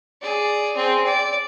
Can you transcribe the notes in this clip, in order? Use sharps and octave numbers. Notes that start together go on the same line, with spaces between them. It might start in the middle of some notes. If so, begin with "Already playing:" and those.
G#4 D5
C4 G#4
D5